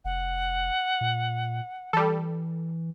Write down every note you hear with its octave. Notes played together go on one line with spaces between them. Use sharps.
F1 F#5
A#2
E3 G3 A4